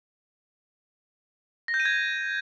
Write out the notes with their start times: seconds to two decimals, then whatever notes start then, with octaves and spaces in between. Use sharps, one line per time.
1.68 A#6
1.74 G6
1.80 D#7
1.85 G#6